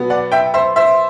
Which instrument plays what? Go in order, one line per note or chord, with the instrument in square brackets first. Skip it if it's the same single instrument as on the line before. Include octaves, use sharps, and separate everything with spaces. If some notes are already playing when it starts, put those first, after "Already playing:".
Already playing: [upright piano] B2 F#3 B3
D5 F#5
E5 G5
C5 E5
C5 E5